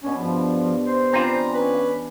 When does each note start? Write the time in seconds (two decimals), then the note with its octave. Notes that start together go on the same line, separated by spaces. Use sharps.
0.04 B2 C#4 D4
0.18 G2 F3 F4
0.84 C5
1.13 E3 C4 D4 F4 G#5 A#5
1.54 C#4 B4